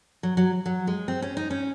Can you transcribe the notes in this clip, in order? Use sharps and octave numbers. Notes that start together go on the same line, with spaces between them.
F#3
F#3
F#3
G#3
C4
C#4
D#4
C#4